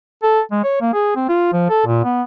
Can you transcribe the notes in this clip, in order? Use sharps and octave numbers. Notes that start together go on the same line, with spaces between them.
A4
G#3
C#5
A#3
G#4
C4
F4
F3
A4
A#2
B3